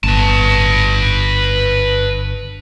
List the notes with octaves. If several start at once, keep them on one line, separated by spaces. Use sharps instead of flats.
G1 B4 A5